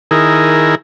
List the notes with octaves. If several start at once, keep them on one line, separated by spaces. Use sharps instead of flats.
D#3 E4 G#4 A#4